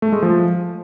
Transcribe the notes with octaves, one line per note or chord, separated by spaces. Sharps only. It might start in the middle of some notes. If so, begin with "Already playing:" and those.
A3
G#3
F3